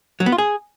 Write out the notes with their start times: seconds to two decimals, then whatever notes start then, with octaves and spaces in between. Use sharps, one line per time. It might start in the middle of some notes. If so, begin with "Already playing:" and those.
0.20 F#3
0.26 B3
0.32 F4
0.38 G#4